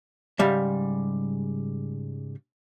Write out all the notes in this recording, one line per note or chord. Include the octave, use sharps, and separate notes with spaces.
G#2 C#3 G3 E5